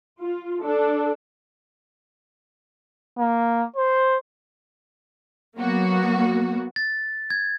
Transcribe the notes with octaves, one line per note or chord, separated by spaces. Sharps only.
F4
D4 A4
A#3
C5
F#3 A#3 B3 F#4
A6
G#6